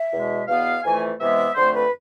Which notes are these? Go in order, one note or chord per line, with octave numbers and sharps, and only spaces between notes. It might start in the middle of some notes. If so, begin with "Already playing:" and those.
Already playing: E5
E2 B2 G#3
E2 B2 B3 F5
F2 E3 A3 G#5
C3 E3 G#3 B3 E5
F2 D3 A3 C4 C5
B4